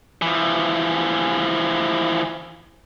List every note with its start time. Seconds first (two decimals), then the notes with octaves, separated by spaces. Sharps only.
0.22 E3 F3